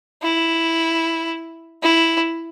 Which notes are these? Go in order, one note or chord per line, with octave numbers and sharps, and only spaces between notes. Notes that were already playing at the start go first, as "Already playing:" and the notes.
E4
E4